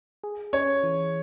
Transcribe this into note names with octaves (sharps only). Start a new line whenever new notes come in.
G#4
C#4 C#5
E3